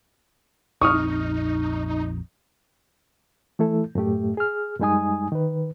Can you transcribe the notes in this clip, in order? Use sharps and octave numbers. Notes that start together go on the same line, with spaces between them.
A#1 F2 C4 D#4 C#6 D#6 F6
E3 A3 E4 A4
F#2 A2 A3 G4
G#4 F6
F#2 G3 G#3 D#4 G#5 D#6
D#3 B4